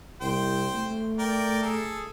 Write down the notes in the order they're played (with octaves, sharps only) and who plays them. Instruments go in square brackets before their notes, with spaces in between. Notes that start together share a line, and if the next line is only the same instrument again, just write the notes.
[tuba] C2 [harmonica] C5 G5
[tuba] A3
[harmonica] A#4 D5 G5
G#4 A4